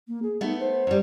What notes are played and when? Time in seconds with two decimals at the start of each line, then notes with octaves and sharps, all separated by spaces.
0.07 A#3
0.22 G#4
0.41 A3 B3 D#4
0.59 C5
0.87 F#2 G3